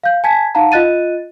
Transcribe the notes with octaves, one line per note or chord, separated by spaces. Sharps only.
F5 G6
G#5 A5 G#6 B6
D#4 F5 F#5 A5 A#5
F4 D#5 F#6 A6 D#7